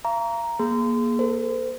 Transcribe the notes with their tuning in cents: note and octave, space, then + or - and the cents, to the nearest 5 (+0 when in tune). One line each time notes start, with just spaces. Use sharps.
F5 -40 A#5 +5 C#6 +45
A#3 +20 G#4 +10 C6 -30
A4 +40 C5 -35